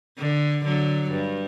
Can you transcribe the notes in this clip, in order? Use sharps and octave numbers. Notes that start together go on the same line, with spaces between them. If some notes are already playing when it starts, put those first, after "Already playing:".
D3
D3 F#3
G2